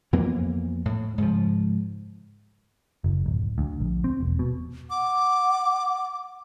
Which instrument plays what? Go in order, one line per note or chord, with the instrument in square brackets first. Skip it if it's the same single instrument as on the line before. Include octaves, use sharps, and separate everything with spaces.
[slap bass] F2 E3 A#3 B3
A2
G#2 C#3 F3
[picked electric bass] F#1
D1
D2
A#1
C4
E1
B2
[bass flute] F#5 [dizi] D6